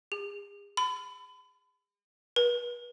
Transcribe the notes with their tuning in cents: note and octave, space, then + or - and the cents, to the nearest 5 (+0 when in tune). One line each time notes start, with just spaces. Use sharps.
G#4 -40
B5 +35
B4 -35